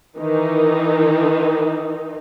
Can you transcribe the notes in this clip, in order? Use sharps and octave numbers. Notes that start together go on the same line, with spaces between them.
D#3 E3 D#4